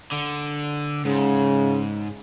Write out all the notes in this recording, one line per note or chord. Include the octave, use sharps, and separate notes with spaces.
D3
G#2 C#3